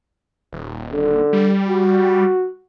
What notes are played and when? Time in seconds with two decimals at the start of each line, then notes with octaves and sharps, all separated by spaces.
0.52 D#1
0.93 D3
1.33 G3
1.68 F#4